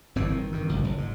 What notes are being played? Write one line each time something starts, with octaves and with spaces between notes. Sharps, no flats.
G1 A2 E3 C4
D#3
G2 D#3
G1 C#2 A#2
F#1
G#2